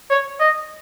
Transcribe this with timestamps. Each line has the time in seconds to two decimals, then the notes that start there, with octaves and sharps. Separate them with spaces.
0.10 C#5
0.40 D#5